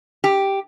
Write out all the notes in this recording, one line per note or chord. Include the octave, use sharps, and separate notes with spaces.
G4